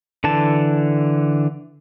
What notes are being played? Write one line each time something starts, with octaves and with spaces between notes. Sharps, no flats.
D3 E3 A5